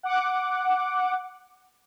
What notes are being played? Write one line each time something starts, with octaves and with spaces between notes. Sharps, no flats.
F#5 D6